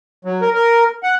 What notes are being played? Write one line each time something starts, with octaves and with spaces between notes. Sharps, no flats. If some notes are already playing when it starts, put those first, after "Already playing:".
F#3
A#4
A#4
F#5